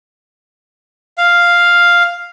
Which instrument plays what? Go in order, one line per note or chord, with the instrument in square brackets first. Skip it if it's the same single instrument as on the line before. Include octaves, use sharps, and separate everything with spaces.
[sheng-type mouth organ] F5